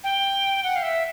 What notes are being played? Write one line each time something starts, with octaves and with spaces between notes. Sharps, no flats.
G5
F#5
F5
E5